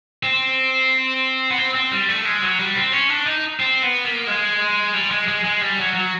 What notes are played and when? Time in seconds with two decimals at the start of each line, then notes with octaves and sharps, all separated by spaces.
0.23 C4
1.50 B3
1.58 C4
1.75 C4
1.91 G3
2.09 A3
2.25 G#3
2.42 F#3
2.59 G3
2.75 C4
2.92 C#4
3.09 D4
3.26 D#4
3.60 C4
3.82 B3
4.05 A#3
4.27 G#3
4.94 G3
5.11 G#3
5.28 G#3
5.45 G#3
5.61 G3
5.78 F#3
5.95 F#3